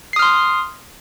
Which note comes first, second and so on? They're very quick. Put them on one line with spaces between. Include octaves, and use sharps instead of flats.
C7 D#6 F6 C6